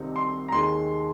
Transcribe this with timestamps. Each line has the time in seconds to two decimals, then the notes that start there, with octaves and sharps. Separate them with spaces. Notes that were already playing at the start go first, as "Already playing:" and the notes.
Already playing: C2 C3 D#3 C4 D#4
0.16 C6
0.48 A#5
0.52 D#2 D#3 G#3 C6